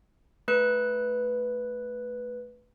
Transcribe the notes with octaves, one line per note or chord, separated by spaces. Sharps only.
A3 B4 F#6